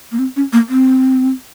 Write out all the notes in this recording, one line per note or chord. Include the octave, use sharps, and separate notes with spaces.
A#3
C4
C#4
A#3
C4